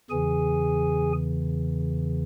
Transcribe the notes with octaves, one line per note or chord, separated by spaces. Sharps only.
E2 C#3 E3 G#4 G#5